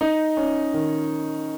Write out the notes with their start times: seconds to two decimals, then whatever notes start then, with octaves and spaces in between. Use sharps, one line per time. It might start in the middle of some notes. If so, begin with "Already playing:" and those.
0.01 D#4
0.37 C#4
0.74 D#3